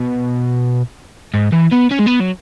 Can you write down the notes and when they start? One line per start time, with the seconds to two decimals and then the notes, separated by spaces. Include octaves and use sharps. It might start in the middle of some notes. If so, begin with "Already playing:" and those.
Already playing: B2
1.34 G#2
1.53 E3
1.72 B3
1.91 C#4
1.99 G#3
2.07 B3
2.20 F#3